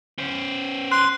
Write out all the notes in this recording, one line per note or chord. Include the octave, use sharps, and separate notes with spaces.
C#4 C5
C6 F#6